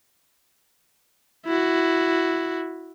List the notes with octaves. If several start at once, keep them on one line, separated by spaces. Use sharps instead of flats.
E4 F#4